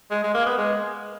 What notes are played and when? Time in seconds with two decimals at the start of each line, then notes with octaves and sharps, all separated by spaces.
0.11 G#3
0.23 G#3
0.34 A#3
0.46 B3
0.58 G#3